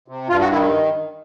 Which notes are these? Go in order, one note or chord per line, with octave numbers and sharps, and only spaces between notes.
C3
G2 F4
F#4
D#3 E4